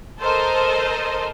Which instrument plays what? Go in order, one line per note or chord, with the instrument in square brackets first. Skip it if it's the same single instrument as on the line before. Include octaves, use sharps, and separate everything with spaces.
[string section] A4 A#4 C5 D#5